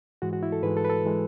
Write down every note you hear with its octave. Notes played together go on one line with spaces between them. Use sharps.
G#2 E3 G#3 F#4
F#4
E4
A4
G#2 E3 G#3 B4
A4
B4
A4
E3 G#3